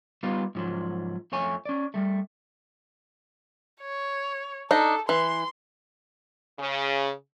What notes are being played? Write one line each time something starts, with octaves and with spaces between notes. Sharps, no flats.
G3 B3 D#4 F4
G#2 F3 F#3
F2 A3 C#5 G#5
C#4 D5
G3 A3
C#5
D4 D#4 A4
E3 C6
C#3